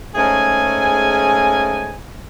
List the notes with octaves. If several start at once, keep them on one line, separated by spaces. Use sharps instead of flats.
G#2 A3 C#4 G#4 G#5